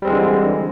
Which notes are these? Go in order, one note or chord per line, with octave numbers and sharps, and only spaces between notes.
D3 E3 G3 G#3 C4